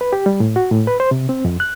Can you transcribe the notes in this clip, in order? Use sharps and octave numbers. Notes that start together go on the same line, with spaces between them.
B4
G4
G3
A2
F#4
A2
B4
C5
C3
C4
F2
F#6